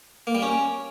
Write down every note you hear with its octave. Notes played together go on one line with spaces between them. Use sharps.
A#3
G3
C#4